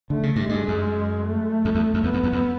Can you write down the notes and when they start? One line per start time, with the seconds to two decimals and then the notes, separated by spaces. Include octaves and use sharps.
0.10 D3 A3
0.23 C#3
0.36 G2
0.49 G2 G#3
0.68 F#2
1.26 A3
1.65 F2
1.75 E2
1.94 F2
2.04 E2 B3
2.14 F2
2.23 E2
2.33 F2